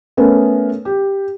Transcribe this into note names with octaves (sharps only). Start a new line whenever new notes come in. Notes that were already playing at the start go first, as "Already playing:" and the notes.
A3 B3 C#4 A#4
G4